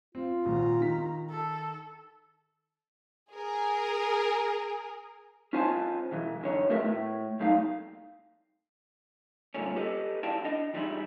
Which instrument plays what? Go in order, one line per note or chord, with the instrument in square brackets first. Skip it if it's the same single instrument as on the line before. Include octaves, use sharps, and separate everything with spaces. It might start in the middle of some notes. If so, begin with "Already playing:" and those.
[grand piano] C4 [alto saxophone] F4
[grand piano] G#1 A#2 [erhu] A#5
[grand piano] D#3 B6
[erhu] A4
[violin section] G#4 A#4
[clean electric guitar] C#4 F4 C5 G#5 A5
B2 E3
F#2 D3 C#5
E2 A3 F#4 A#4 B4 E5
A2
C2 F#2 A3 D#4 F5
G2 A#2 D3 C#4
G4 A4 B4 D#5
E4 F#4 D5 F5 G5 A5
D4 D#5
E3 G3 G#3 D#4 E4